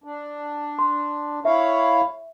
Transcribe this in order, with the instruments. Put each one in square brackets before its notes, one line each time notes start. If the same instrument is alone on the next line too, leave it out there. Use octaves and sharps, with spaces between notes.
[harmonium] D4
[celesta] C6
[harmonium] E4 C#5 F5 [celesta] E5